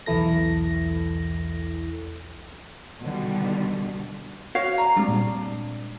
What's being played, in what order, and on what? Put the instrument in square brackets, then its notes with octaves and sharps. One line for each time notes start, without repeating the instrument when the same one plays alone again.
[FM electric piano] B1 E2 E3 E4 A4 A#6
[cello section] B2 D3 D#3 G3
[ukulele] F#4 C#5 F5
[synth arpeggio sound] D5 [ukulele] A#5
[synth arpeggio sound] G3 G#3 C4 [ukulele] D4
[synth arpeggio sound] A#2